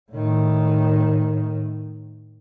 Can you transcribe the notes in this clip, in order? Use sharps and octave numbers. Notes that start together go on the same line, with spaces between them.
A2 D#3